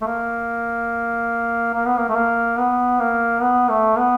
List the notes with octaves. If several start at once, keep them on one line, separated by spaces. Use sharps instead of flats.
A3
A#3
A#3
B3
A#3
A3
A#3
B3
A#3
B3
A3
B3